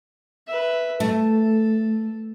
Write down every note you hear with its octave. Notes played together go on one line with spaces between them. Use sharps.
B4 E5
A3 A4